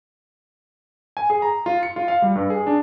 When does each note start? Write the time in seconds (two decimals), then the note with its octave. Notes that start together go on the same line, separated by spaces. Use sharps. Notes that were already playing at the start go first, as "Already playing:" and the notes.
1.17 G#5
1.30 G#4
1.42 A#5
1.66 F4
1.83 C#7
1.96 F4
2.08 F5
2.22 G3
2.35 G2
2.50 G#4
2.67 D4